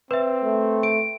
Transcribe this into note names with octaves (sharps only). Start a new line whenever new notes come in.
C4 B4 E5
A3
D7